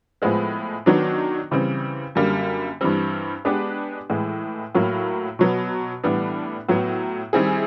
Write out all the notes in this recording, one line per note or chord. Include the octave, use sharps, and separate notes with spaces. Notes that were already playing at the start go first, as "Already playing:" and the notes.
A2 F3 G#3 B3
D#3 F#3 B3 D4
C#3 E3 G3 C4
F#2 D3 G3 A#3
G2 E3 G3 C4
G#3 B3 D4 G4 B4
A2 E3 G#3
A2 F#3 A#3
B2 F#3 B3
A2 E3 G3 B3 D4
A2 F#3 B3
D#3 G3 C4 E4 G#4